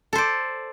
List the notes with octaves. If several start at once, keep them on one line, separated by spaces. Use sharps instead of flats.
A4 C5 D5